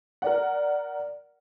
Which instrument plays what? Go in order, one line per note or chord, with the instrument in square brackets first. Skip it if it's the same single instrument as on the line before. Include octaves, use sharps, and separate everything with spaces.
[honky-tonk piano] A#4 D5 F#5